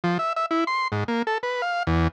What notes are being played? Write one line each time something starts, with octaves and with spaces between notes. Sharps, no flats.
F3
E5
E5
E4
C6
G#2
A#3
A4
B4
F5
E2